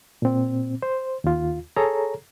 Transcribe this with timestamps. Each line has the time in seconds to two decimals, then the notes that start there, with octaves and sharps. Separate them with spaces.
0.22 A#2 C4
0.82 C5
1.24 D#2 F4
1.76 G#4 A4 C#5 A#5